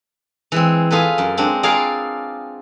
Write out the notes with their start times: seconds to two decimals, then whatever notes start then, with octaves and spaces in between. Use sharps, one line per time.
0.52 E3 G#3 C4
0.91 F4 G#4 A4 B4
1.18 F#2
1.37 G#3 C4 D4
1.63 F4 G#4 A#4 D5 F5 F#5